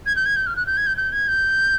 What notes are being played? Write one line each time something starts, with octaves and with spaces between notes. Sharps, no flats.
G#6
G6
G#6
G6
F6
F#6
G6
G#6
G6
G6
G#6
G6